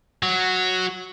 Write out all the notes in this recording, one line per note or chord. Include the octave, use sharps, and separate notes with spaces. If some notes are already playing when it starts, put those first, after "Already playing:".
F#3